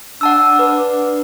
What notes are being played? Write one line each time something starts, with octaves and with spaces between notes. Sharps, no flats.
D4 F#5 A5 E6
B4